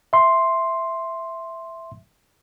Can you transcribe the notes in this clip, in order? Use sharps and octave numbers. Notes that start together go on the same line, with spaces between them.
E5 C6